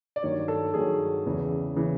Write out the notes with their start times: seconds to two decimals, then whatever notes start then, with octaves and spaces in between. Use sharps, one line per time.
0.16 D5
0.23 G2 D#3 F#3 C#5
0.48 A4
0.74 G2 D#3 F#3 G#4
1.26 E2 C#3 E3
1.76 C#3 E3